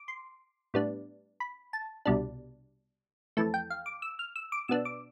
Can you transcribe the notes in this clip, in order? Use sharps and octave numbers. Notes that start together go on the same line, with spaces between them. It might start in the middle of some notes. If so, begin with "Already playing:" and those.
Already playing: D6
C6
A2 G3 B3 D4
B5
A5
C2 B2 G3 D4
F2 E3 A3 A5
G5
F5
D6
E6
F6
E6
D6
B2 B3 D4 E6
D6